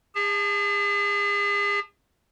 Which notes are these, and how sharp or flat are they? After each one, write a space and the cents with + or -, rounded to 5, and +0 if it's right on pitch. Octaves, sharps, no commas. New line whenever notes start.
G#4 -40 A5 -5